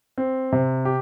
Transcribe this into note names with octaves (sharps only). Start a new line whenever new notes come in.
C4
C3
G4